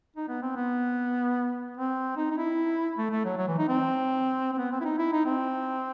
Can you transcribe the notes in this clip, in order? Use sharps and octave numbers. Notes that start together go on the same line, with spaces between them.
D#4
B3
C4
B3
C4
D#4
D#4
E4
A3
A3
F#3
F#3
E3
D#4
C4
C4
B3
C4
E4
D#4
E4
D#4
C4